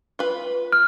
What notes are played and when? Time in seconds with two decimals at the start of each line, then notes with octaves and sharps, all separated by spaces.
0.19 F4 B4
0.72 F6